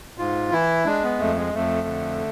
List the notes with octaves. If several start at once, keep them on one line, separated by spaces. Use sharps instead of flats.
G#2 F4
E3 E4
G#3 D4
B3
F2 A3
G#3
F2 A3
D3